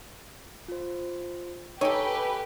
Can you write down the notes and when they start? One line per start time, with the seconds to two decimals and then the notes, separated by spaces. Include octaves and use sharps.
0.68 F4 C5
1.81 D#4 G4 A4 B4 C#5 G#5 E6